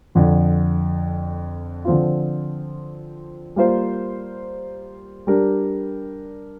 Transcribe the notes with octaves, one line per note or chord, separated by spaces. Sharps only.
F2 D3 F3
D3 F3 C4 F4
G3 A#3 F4 C5
G3 D4 G4 A#4